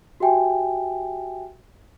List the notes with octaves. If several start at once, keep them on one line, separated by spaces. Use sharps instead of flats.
F#4 G4 E5 G5 G#5